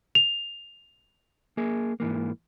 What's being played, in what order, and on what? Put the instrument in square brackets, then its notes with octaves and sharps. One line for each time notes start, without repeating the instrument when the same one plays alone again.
[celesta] F7
[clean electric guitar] A#3 G#4
G#2 E3 A#3